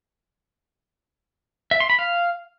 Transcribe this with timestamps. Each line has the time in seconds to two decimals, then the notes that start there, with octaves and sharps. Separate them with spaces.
1.71 E5
1.80 C6
1.90 B5
1.99 F5